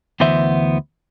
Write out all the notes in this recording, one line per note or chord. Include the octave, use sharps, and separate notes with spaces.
D2 E3 B3 C5 E5